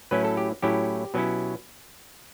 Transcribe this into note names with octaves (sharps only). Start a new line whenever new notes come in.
A2 F#3 C#4 E4 B4
A4
G4
A2 F#3 C#4 E4 G4
B2 F#3 C#4 E4